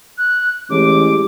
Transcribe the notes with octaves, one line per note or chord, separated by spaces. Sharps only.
F#6
A1 G#3 E4 G4 D6